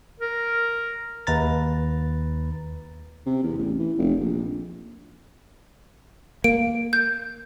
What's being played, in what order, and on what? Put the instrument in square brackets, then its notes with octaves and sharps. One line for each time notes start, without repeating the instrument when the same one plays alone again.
[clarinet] A#4
[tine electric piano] D#2 B4 A#5 A6
[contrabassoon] C3
E2
A1
E3
F1
A#1
[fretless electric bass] A#3 [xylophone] D7
[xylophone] G6